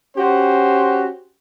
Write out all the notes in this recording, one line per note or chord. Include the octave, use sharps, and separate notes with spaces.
C#4 F#4 G4 C5